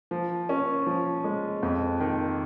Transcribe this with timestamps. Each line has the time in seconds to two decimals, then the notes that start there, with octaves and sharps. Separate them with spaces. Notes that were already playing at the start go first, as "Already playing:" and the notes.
0.11 F3
0.49 C#4
0.87 F3
1.24 G#3
1.63 F2
2.00 D#3